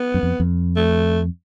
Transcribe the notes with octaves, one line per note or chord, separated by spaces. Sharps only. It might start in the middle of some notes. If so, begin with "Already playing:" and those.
Already playing: B3
F#2
F2
F2
A3